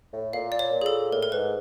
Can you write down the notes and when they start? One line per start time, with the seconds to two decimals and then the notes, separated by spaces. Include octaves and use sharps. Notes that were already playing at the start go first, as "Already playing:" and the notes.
0.13 A2
0.33 A#2 F5
0.52 D5
0.59 C#5
0.73 A#2
0.81 G#4
0.86 A4
1.12 A2 A#4
1.23 A#4
1.32 G#2 B4